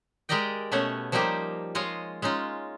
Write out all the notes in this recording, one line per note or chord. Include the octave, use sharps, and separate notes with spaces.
G#3 G4 A#4 D5 D#5 G5
B2 A3 B3 C#4 C#5
F3 G3 A#3 D#4 G4 C5
G#3 F4 C#5 D#5 F5
G#3 C#4 D#4 F4